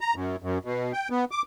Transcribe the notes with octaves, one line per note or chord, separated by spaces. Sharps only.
A#5
F#2
F#2
B2
G5
B3
D6